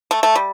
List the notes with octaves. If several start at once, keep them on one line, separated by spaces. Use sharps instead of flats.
A3
A3
G3